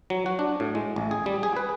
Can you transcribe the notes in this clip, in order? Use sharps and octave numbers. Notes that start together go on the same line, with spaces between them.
F#3
F#4
D4
A2
G#3
A1
G#4
G3
G#4
B4